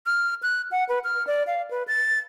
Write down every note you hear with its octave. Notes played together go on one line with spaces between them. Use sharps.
F6
F#6
F#5
B4
F6
D5
F5
B4
A6